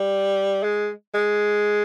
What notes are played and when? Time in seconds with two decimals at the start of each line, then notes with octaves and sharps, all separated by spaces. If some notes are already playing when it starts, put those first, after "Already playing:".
Already playing: G3
0.63 G#3
1.14 G#3